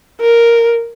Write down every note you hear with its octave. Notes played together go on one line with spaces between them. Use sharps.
A#4